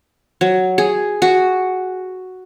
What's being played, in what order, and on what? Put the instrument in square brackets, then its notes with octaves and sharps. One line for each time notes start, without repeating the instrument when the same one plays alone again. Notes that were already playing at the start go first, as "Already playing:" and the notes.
[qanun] F#3
G#4
F#4